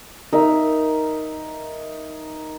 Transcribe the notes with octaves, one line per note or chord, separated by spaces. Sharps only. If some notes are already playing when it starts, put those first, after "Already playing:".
D#4 A#4 E5